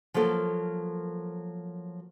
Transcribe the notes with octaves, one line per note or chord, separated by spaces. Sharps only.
F3 F#3 A#3 A4 A#4